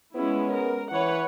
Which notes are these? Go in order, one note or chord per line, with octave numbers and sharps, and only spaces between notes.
G#3 B3 C#4 E4
A#4
E3 B4 C#5 F#5